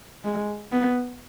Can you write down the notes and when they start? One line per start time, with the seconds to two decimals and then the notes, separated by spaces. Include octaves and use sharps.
0.24 G#3
0.72 B3